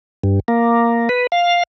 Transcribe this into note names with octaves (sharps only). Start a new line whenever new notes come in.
G2
A#3
B4
F5